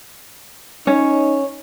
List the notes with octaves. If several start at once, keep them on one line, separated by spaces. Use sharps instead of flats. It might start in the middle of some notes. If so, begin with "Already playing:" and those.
C#4 D#4 C#5